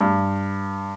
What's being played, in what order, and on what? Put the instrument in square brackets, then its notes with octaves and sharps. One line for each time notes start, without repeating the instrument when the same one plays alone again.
[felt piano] G2